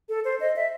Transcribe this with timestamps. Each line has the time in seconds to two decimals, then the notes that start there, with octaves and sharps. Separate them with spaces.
0.09 A4
0.25 C5
0.40 D#5
0.56 E5